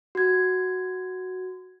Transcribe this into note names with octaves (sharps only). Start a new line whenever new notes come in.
F#4 G#6